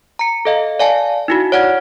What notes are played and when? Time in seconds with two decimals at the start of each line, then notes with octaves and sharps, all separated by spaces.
0.19 A#5 C#7
0.45 A4 D#5 F5
0.80 D5 F5 G#5 A5
1.28 D#4 E4 F#4
1.52 C#5 D5 F#5 F6 G#6